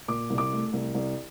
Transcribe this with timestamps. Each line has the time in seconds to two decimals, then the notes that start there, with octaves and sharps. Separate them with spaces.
0.08 A#2 D6
0.30 C2
0.38 D6
0.52 A3
0.73 C2
0.95 C2